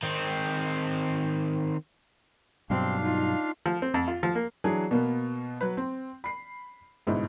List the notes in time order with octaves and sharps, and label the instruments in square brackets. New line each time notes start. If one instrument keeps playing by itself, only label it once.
[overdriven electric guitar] D#3 C4
[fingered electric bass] G2 B2 F#3 [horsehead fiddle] C4 [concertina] D4 F5
[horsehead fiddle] D#4 F4
[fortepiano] F3
C4
F2
F4
F3
A#3
[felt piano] E3 F#3 D4 G#4
B2 A#3 B3
F#3 B4
C4
B5 C7
G1 G#2 B2 E4 D#5